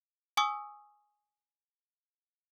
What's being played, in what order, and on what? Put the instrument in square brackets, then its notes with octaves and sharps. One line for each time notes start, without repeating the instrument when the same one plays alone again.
[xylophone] G#5 C#6 D#6 E6